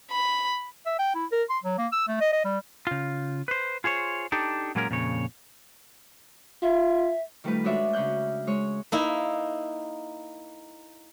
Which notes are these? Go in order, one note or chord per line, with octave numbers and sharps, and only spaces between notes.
B5
E5
G5
E4
A#4
C6
F#3
A#3
E6
A3
D#5
D#5
G3
C#3 F4
B4 C5
F4 G#4 C5 C#5
D4 D#4 G4 A4
A#2 F#3 G#3 A#3 C#4 A#4
F2 A#2 C#3 C#5
F4 E5
D#3 G3 A3 F4 B4
G#3 D4 F#4 C#5 D5 E5
C#3 C#4 D4 F#6 G6
G#3 C#5
A#3 D#4 E4